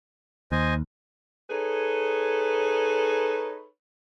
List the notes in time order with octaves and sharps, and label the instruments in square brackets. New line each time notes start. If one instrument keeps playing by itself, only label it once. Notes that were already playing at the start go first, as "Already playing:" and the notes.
[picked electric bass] D#2 [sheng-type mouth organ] C5 D#5 G#5
[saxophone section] D#4 G#4 A4 B4 C#5